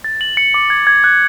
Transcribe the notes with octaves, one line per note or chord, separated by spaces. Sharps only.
A6
F#7
C#7
D6
G#6
G#6
F#6